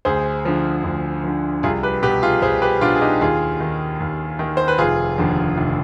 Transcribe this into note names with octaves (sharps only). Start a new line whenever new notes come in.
D2 G#4 C5
D3 F3
D2
D3 F3
C2 F4 G#4
G4 B4
B2 G4 B4
F4 G#4
C2 G#4 C5
G4 B4
B2 D4 F4
G#4
D#4 G4
D#2 F4 G#4
D#3
D#2
D#3
C5
B4
F1 F4 G#4
D#2 D3 F3
F1